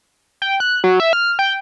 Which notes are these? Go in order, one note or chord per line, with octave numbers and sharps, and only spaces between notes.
G5
F#6
F#3
E5
F6
G5